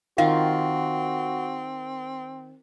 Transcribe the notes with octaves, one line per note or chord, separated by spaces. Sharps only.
D#3 C4 F4 F#4 F5